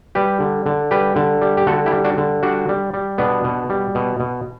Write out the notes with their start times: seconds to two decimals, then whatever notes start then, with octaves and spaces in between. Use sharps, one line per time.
0.15 G3 G4 B4
0.40 D3
0.66 D3
0.91 G3 G4 B4
1.16 D3
1.42 G3
1.57 G4
1.67 D3 F#4 A4
1.86 E4 G4
1.92 G3
2.04 D4 F#4
2.18 D3
2.43 G3 D4 F#4
2.69 G3
2.94 G3
3.18 B2 B3 D4
3.44 B2
3.70 G3
3.95 B2
4.20 B2